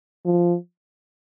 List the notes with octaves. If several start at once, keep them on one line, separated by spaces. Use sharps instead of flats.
F3